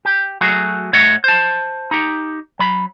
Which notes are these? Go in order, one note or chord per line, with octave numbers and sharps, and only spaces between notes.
G4
F#3 A3 F#4 G#4
A2 A3 C#5 D#5 F#5
C5 A5
D#4 G4
F#3 B5